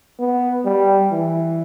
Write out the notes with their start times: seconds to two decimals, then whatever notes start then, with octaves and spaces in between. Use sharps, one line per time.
0.19 B3
0.65 G3
1.12 E3